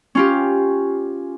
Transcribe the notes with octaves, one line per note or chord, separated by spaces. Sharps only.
C#4 F4 G4